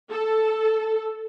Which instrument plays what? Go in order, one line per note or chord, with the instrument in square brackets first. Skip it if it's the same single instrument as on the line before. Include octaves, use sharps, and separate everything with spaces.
[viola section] A4